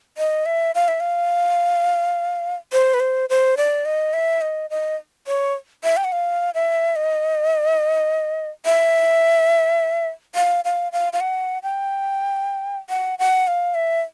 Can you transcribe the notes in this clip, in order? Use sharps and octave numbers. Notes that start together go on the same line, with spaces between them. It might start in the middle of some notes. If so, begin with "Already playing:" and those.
D#5
E5
F5
E5
F5
C5
B4
C5
C5
D5
D#5
E5
D#5
D#5
C#5
E5
G5
F#5
F5
E5
D#5
E5
F5
F5
F5
F5
F#5
G5
F#5
F#5
F5
E5